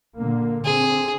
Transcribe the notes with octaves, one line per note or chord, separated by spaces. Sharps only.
A#2 D3 A#3
D3 C4 G#4